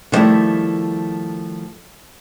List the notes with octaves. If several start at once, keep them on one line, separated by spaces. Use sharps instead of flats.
D3 D#3 F3 G3 A3 E4